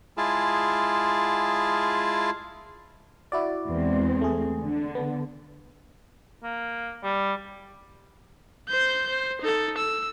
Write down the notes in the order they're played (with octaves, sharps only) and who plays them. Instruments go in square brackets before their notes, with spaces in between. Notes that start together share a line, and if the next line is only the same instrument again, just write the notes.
[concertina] G#3 E4 F4 G#4 A5
[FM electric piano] E4 F#4 D5
[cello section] E2 G#3 C4
[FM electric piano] A3 G#4
[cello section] D3
[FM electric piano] B3
[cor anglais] A#3
G3
[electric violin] C5 G6
C5
D#4 A4
E6